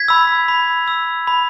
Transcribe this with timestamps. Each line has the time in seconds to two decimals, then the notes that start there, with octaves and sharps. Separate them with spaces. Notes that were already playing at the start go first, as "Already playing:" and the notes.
Already playing: G#6 B6
0.08 B5 E6
0.48 B5
0.88 E6
1.27 B5